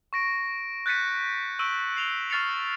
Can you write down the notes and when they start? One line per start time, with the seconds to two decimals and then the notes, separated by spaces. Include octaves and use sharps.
0.13 C#6 A#6 D7
0.86 F#6 G6 A6 B6 C#7 D#7
1.59 C#6 E6 D7 D#7 F#7 G7
1.97 C7 F7 G7
2.30 C#6 F6 A6 C7 C#7 F7